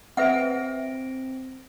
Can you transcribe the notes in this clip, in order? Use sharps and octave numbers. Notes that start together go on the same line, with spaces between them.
C4 B4 E5 F#5 A#6 D7